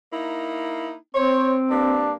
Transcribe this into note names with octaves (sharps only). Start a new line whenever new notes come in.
A#3 D#4 E4
C4 C5 C#5
G2 A#3 D4